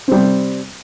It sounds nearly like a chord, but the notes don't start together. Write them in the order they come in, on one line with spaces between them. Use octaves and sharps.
C4 G3 C3